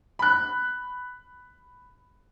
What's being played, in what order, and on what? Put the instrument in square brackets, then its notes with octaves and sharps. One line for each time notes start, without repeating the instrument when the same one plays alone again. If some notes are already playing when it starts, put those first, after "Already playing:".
[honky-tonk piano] B5 F#6